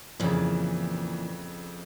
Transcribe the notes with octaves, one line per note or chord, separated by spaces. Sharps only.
F2 A#2 C#3 E3